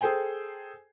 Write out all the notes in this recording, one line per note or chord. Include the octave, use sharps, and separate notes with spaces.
G#4 A4 C5 G5 G#5